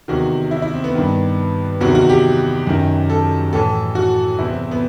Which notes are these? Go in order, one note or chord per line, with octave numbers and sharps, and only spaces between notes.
E2 C3 D#3 F#4
E4
E4
C4
B3
G2 D#3
E2 C3 D#3 F#4
F#4
G4
F#2 D#3
A4
A2 E3 A4
F#4
E2 C3 E3 E4
C4
B3